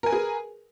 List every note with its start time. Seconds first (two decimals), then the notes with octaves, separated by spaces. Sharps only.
0.03 A#4
0.06 G#5
0.09 B4
0.12 G#4